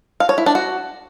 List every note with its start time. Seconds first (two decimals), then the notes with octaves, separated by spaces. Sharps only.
0.20 F5
0.29 C#5
0.38 E4
0.46 D4
0.55 F#4